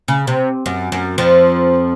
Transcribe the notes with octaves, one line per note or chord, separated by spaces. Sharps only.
C#3
C3
F#2
F#2
F2 F3